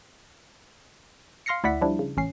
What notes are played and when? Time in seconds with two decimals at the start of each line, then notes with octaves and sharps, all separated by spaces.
1.46 F5 C6 F6 A#6 C7 C#7
1.63 D2 E4 D5 E5 F#5 B6
1.81 F3 G3 D4 E4
1.99 C#3
2.17 A1 C#4 C7